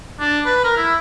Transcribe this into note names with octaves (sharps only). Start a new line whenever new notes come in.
D4
B4
A#4
E4